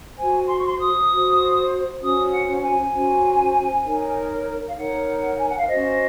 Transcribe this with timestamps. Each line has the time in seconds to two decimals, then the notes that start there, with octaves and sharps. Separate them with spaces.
0.17 F#4 C5 G#5
0.48 C6
0.57 C#6
0.66 C6
0.79 D#6
1.09 F#4 C5
2.01 C#4 F#4 C5 D#6
2.32 F#5
2.62 G#5
2.92 C#4 F#4 C5
3.84 D#4 A#4 C#5
4.66 F5
4.75 D#4 A#4 C#5 F#5
5.38 G#5
5.48 F#5
5.58 F5
5.67 C#4 F#4 C5 D#5